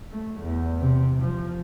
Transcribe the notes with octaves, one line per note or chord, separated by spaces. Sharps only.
A3
E2
C3
F3